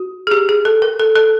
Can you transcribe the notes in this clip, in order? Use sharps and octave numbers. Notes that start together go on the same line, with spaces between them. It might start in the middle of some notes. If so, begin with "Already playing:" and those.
Already playing: F#4
G#4
G4
G#4
A4
A#4
A4
A4